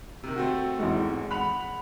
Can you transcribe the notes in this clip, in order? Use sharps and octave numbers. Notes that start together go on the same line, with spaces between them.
C3 D#3
A3 C4 F#4
E2 G#2
F#5 B5 F#6 F7